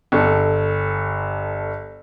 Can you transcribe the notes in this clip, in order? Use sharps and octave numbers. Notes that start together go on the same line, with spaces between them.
G1 A4